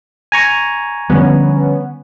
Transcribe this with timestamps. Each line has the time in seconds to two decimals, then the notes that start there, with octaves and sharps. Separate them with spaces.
0.32 G#5 A#5 C#6
1.10 D3 F3 G3 B3 C#4